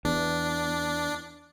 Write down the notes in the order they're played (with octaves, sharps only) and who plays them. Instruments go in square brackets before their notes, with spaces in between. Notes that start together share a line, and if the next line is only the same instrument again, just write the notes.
[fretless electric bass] E2 [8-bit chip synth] D4